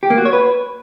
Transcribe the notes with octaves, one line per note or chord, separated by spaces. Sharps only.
G4
A#3
F#4
C#5
B4